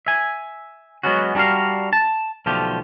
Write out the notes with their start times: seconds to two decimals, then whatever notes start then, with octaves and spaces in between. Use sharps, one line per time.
0.07 E5 G#5
1.03 F#3 G#3 B3 C#4 F#4
1.35 G3 D4 F#4 A#4 F5
1.93 A5
2.46 B1 D3 F3 A3 F4 G4